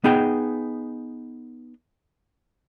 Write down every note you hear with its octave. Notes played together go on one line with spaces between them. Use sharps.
B3 D#4 G#4 G5